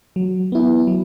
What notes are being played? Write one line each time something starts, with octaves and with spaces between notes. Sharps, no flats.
F#3
B3 E4
F#3